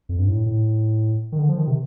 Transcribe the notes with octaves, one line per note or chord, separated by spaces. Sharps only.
F2
G2
A2
A2
D#3
D3
F3
D#3
C3